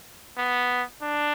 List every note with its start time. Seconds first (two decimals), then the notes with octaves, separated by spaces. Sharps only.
0.37 B3
1.03 D4